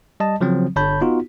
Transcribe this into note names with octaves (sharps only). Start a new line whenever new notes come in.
G3 D#5 A5
C#3 F3 F#3 C4
G1 D3 C#5 A5 B5 G6
B3 D#4 F4 F#4